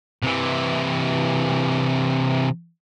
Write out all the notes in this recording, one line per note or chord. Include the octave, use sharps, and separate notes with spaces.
C3 E3